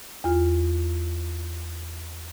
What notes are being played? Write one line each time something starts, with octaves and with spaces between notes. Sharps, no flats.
E2 F4